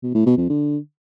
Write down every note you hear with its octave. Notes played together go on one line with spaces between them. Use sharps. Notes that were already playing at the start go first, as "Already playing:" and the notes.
B2
A2
B2
F2
D3